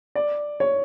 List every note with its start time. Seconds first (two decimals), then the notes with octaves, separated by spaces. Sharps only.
0.15 D5
0.60 C#5